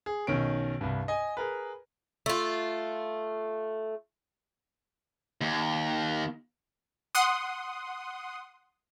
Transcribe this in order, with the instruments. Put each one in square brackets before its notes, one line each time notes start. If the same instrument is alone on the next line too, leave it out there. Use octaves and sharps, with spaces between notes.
[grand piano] G#4
B1 D#3 C#4 D7
C2 G2
D#5 G#5
G#4 A#4 B4
[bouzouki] A3 F4
[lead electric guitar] D#2
[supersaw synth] F#5 C6 D#6